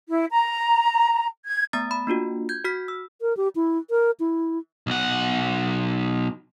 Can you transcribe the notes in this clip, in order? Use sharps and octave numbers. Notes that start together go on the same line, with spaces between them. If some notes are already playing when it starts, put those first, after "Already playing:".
E4
A#5
G#6
A3 B3 A#5 D#6 A6
B5
A#3 D4 F4 F#4
G6 G#6
F#4 F6 B6
E6
A#4
G4
E4
A#4
E4
B1 F#5